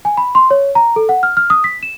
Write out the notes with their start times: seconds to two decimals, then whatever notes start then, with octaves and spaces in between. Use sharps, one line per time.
0.05 G#5
0.17 B5
0.35 C6
0.51 C#5
0.75 A#5
0.96 A4
1.09 F#5
1.23 F6
1.37 F6
1.50 D#6
1.64 B6
1.83 E7